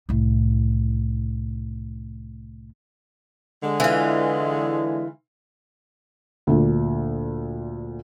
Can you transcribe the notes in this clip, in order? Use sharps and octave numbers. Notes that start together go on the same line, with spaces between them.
C2 A2
D3 G#3
E3 F4
D2 A#2